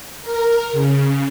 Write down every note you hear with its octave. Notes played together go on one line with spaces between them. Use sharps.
A#4
C#3